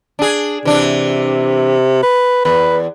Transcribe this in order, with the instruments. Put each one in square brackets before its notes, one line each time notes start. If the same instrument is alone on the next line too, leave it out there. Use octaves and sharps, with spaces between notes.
[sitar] D4 G#4
[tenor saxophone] C3 [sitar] E3 D4
[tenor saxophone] B4
[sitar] E2 [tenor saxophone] B4